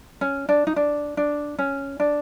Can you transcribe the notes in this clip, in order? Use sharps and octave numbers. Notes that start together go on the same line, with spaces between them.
C#4
D4
D#4
D4
D4
C#4
D4